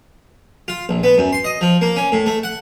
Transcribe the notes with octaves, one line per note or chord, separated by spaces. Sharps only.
F4
A#1
B3
F#2
C6
D#5
F3
A#3
C#4
A2
A3
F#5